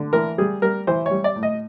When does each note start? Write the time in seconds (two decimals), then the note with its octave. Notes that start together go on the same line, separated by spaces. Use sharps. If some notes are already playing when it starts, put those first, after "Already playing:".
Already playing: D3
0.13 E3 A#4
0.38 G3 G#4
0.62 G3 A#4
0.87 E3 C5
1.06 C#5
1.11 G3
1.24 D5
1.36 A2
1.43 D#5